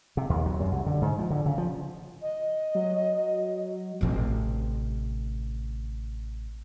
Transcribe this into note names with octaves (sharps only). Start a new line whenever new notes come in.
C3
D#2
F#3
F#2
C2
D3
G#2
F3
D3
C#3
F3
D#5
F#3
A1 C3